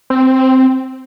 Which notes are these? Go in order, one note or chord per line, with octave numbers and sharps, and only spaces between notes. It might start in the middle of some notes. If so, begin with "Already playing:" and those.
C4